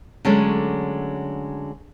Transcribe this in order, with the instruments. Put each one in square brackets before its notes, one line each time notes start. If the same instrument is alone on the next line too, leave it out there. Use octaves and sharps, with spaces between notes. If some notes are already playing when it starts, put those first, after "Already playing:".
[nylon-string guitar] D3 F#3 G#3 A3 C#4 D4